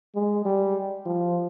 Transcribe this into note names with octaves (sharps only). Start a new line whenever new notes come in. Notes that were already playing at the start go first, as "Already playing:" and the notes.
G#3
G3
F3